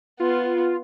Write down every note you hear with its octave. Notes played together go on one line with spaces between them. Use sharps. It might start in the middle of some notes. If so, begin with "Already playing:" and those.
B3 F4